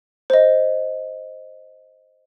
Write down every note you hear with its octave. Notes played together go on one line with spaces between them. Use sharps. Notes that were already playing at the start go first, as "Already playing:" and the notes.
C5 D#5